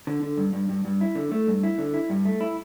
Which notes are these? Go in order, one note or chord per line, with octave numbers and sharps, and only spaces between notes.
D3
D3
G2
G2
G2
G2
E4
D3
A3
G2
E4
D3
E4
G2
A3
E4